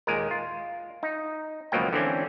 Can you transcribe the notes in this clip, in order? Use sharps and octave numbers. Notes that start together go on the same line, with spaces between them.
D#2 A#2 G#3 A#4
F4
D#4
C#2 B2 F3 F#3 A#3 G5
D3 E3 C4 C#4